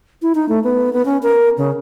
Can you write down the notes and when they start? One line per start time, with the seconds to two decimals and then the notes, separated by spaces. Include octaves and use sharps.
0.22 E4
0.35 D#4
0.49 A3
0.64 B3
0.93 B3
1.05 C#4
1.23 A#4
1.58 C#3